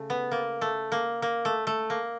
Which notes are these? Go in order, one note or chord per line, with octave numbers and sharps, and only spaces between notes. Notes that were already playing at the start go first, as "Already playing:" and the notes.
Already playing: C#3 A3
B3
A#3
A3
A#3
A#3
A3
A3
A#3